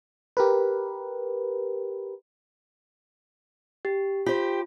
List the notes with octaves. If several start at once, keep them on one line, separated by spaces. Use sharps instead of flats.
G4 A#4 B4
G4
F4 G4 C5